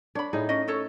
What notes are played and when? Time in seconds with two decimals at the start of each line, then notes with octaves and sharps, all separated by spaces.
0.15 D4 C#5 B5
0.33 A2 D#4 G#4
0.49 C#4 D#5
0.68 C#4 A4 C#5